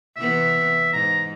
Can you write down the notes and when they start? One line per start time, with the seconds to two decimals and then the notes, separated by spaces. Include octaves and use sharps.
0.16 C3 E3 B3 E5
0.93 G#2 A#5